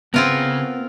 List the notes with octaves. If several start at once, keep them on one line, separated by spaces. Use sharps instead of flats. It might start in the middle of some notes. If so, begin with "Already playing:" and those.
C#3 B3 C4 F4 G#4 A#4